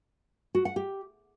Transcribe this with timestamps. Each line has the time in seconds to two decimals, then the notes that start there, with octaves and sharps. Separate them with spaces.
0.55 F#4
0.65 F#5
0.76 G4